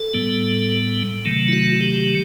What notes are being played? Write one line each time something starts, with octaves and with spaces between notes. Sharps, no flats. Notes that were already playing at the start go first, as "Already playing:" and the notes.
Already playing: A4
A2 G3 B3
C3 D#3 F#3 A3
E4
F#4
G4